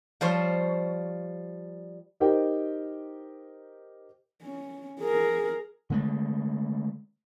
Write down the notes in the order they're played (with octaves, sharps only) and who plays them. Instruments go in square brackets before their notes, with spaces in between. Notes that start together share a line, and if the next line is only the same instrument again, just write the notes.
[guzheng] F3 G3 C5 C#5
[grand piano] D#4 G4 A#4 C5 G5
[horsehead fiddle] C#4
G#4 A#4
[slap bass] D3 G#3 A3